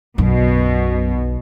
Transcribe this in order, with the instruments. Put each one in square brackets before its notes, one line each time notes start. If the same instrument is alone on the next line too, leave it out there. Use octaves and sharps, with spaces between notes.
[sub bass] B1 [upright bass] F#2 [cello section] B2